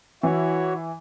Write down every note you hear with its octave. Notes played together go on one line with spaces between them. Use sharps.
E3 E4 F#4 C#5